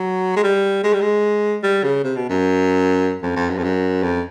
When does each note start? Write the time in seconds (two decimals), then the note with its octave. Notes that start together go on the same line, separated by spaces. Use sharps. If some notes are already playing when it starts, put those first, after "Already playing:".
Already playing: F#3
0.36 G#3
0.44 G3
0.84 G#3
0.93 G3
1.01 G#3
1.63 G3
1.83 C#3
2.04 C3
2.17 B2
2.30 F#2
3.23 F2
3.36 F2
3.50 F#2
3.58 F2
3.64 F#2
4.03 F2